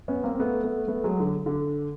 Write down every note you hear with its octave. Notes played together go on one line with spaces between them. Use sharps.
B3 C#4
A#3 C4
C4
A3 B3
A3 B3
A3 B3
F#3 G#3
D3
D3